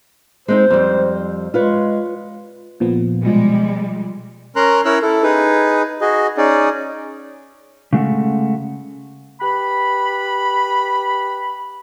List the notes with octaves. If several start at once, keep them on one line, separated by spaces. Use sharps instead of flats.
G#3 C4 D#4 C5
F2 G3
G#3 F4 B4 C#5
A#2 F3 B3
B2 F3 G3 G#3
C#4 A#4 A#5 C6 F#6
C#4 E4 A#4 C#5 E6 F#6
E4 A4
D#4 G#4 B4
F#4 G#4 D#5
C#4 D#4 G#4 D5
C#3 G#3 A3 F#4
G4 B4 B5